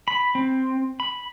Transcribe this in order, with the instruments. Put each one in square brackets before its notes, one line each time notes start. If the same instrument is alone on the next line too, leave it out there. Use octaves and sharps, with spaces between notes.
[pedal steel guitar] B5
C4
B5